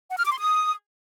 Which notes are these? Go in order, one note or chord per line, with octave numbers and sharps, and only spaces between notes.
F#5
F6
D6
C6
D#6